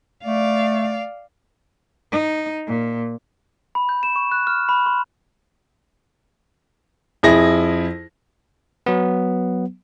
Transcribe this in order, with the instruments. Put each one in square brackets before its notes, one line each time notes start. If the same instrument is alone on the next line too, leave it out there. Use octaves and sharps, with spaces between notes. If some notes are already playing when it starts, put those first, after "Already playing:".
[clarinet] A3 [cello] D5 F5
[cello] D#4
A#2
[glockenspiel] B5
G6
E7
C#6
F#6
F6
B5
C6
[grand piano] F2 E4 G#4 A#6
[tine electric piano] F#3 B3